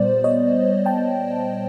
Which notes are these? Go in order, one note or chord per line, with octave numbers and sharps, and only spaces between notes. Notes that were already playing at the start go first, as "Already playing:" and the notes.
Already playing: A#2 G3 B3 C5 D5
C#5 D#5
G5 A5